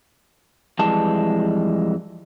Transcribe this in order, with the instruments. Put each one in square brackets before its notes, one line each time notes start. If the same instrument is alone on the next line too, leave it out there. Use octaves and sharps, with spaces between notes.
[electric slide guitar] F2 E3 G3 G#3 A5